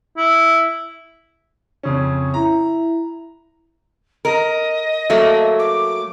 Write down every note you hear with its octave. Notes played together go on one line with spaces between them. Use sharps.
E4
F2 C#3 C#4
E4 A#5
A#4 D#5
F#3 A3 A#3
D6